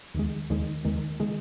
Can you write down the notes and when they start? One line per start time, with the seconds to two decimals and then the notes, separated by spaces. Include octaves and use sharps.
0.15 D#2 D#3 G#3
0.50 D#2 D#3 G#3
0.85 D#2 D#3 G#3
1.20 D#3 G#3